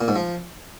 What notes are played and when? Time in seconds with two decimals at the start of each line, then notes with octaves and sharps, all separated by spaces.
0.01 A#2
0.08 G#2
0.16 F3